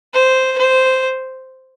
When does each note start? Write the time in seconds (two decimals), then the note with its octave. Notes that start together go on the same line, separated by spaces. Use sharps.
0.14 C5
0.58 C5